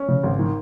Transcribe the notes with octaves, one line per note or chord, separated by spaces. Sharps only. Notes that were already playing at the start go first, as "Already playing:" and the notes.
Already playing: C#4
C#3
G#1
D#3